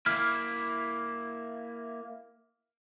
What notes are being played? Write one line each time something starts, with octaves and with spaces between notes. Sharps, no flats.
A#3 E4 F6